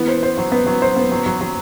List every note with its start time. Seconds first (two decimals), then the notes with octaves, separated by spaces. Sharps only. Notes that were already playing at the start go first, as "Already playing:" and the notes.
Already playing: E3 B3
0.08 C5
0.23 C5
0.38 F#3
0.52 B3
0.67 F#3
0.82 C5
0.97 B3
1.12 F#3
1.26 F#3
1.41 F#3